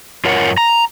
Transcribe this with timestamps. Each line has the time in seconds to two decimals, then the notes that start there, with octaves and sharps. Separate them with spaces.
0.25 F#2 F4 A#4 C#5 F#5
0.58 A#5